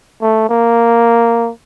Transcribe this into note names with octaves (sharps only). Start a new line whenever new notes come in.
A3
A#3